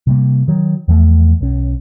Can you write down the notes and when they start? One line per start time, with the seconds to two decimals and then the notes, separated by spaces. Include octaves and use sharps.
0.07 C3 G3 A#3
0.48 D#3 F#3
0.88 E2 F3 A3
1.41 B1 C#4